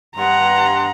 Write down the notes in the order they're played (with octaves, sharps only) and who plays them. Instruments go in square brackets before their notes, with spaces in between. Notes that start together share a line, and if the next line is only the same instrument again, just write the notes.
[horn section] G2 C6 [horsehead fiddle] F#5 A#5